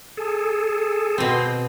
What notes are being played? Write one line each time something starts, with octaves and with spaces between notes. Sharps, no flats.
G#4 A4
B2 C4